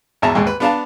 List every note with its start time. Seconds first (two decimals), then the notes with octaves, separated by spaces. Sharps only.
0.22 G#1 E2 E5 A5 A#5
0.35 D#2 G#2 G#3
0.47 B4
0.60 B3 D4 F5 A5